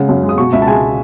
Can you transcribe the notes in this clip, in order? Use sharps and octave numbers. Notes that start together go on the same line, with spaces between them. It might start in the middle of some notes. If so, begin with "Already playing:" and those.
Already playing: C#3 G#3 F#5
F#2
G#3
D#6
B2 C#6
C#2 E5
A5
G#3 G#5